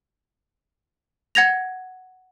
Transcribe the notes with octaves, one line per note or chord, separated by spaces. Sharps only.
F#5 G#6 A#6 F7